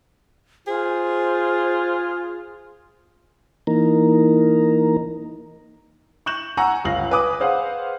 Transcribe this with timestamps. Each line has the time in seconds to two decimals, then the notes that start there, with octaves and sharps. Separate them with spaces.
0.67 F4 G#4 C5
3.67 E3 A#3 D#4 A#4
6.26 C#6 F#6 G6 E7 F#7
6.57 F#5 G#5 A#5 C#6 E6
6.84 G1 C#2 F5 A#6 F#7
7.11 B4 G#5 D6 D#6
7.40 G#4 B4 C5 F5 F#5